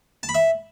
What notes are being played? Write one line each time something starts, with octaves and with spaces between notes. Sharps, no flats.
A5
B5
E5